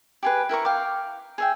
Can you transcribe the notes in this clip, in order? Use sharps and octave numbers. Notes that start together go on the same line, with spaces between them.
G4 G#4 B4
E4 A#4 A#5 C#6
F5 G5 D6
G#4 E5 G5